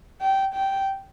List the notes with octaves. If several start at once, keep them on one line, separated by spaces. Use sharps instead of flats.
G5
G5